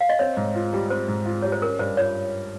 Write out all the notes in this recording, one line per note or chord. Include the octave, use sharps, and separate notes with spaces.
F5
D#5
C4 C#5
G#2
F4
G3
C4 C5
G#2
F4
G3 C#5
C5
C#4 A#4
G2 C5
F4 C#5